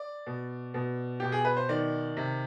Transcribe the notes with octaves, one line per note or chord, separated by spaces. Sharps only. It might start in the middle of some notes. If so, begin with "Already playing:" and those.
Already playing: D5
B2
B2
B2 G4
G#4
B4
C5
D#3 D5
C3